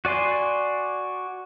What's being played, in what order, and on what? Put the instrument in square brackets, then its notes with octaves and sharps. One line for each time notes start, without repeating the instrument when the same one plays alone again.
[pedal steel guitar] F#4 D5 G#5 C6